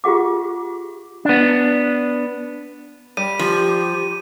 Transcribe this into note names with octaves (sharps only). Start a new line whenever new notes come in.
F4 G4 G#4 F#5 D6
B3 D4
G3 D#7
F3 G4